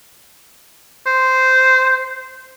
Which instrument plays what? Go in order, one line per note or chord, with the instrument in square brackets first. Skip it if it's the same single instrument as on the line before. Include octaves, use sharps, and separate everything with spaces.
[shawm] C5